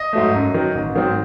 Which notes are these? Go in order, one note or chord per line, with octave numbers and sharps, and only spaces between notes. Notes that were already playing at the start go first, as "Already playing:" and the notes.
Already playing: D#5
G#2 F#3 A3
F#2
D#3 F#3
A1
G#2 D#3 F#3 C4